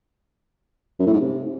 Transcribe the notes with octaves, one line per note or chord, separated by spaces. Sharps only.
F#2
A2
G#2
C3